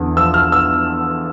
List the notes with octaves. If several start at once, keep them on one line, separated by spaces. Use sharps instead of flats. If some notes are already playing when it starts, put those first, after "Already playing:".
Already playing: E2 D3
F3 E6
F6
E6